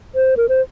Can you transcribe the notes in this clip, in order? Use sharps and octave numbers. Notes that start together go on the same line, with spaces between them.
C5
A#4
C5